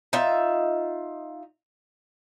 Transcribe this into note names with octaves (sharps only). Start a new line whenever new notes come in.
D#4 F4 E5